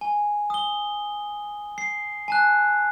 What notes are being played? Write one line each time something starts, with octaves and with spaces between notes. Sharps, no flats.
G#5
D#6 G7
C7
G#5 A5 F#6